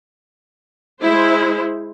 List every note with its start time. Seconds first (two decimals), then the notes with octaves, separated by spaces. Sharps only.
1.01 G#3 E4 C5